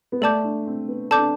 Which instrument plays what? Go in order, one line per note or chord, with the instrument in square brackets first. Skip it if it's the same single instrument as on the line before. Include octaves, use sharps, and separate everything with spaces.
[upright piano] B3
[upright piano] A3 [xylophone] A4 D5 A5 D6 G6
[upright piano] D4
C4
B3
[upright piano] C4 [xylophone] A4 D5 A5 D6 G6
[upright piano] D4